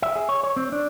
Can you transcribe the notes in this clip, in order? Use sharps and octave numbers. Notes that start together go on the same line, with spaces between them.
E5
G#4
C#5
C#5
C4
D4